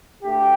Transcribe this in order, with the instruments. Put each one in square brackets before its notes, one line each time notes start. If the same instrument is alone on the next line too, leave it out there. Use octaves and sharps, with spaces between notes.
[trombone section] D2 D3 A3 G4